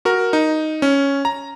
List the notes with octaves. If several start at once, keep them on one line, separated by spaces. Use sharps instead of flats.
F#4 A#4
D#4
C#4
A#5